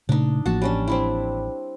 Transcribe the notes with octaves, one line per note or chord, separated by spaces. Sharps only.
A#2 C#3 A3 D4 D#4
A1 F3 A#3 F#4 A5
G3 C#4 D4
C4 D4 E4